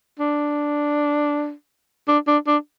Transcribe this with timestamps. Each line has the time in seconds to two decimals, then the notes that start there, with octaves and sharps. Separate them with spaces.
0.19 D4
2.08 D4
2.28 D4
2.47 D4